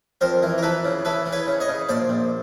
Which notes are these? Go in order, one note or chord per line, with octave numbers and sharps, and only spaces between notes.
F2 A#4 C5
E3
A#4
E3 A4 B4
C#3
E3 A4 B4
E3
B4 C#5
C#3
C#5 D#5
C#3
A#1 C5 D5
A#1